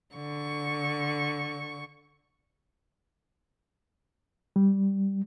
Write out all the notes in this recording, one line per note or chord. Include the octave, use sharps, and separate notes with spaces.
D3 C#6
G3